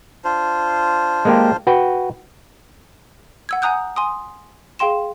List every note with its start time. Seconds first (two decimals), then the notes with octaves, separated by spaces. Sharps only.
0.24 D4 F4 C5
1.25 G#3 A#3 G4
1.67 F#4 B4 G5
3.49 F#5 E6 G#6
3.62 F#5 G#5 A#5 D#6 F#6 G6
3.96 G#5 C6 D#6
4.79 G#4 F5 G5 C6 E7